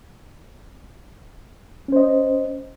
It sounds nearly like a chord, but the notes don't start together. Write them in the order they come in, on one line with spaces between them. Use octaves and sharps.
C#4 C5 D#5